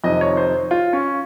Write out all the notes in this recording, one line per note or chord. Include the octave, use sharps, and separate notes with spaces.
F2 C3 D#3 D#5
C#5
C5
F4
C#4